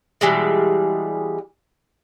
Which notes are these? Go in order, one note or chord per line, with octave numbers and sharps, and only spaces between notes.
B2 E3 G3 G#3